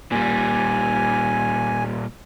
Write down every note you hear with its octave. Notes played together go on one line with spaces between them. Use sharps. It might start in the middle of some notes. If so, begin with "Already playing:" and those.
A#2 G3 G#5